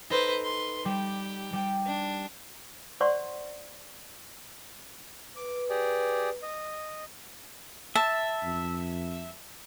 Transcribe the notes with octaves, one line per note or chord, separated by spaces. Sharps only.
D#4 A4 B4 C5
B4 C6
G3 G4
G3 G5
D4
C5 D5 F#5 C6 C#6
B4 D6
G4 G#4 D5
D#5
E5 A5
F2